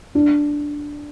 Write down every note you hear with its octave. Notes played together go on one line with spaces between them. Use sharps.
D4